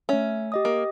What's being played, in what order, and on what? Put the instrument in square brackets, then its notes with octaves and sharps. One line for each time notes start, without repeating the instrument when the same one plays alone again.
[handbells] A3 E5 [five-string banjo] C#4
[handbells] G4 D#5 D#6
[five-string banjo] A#3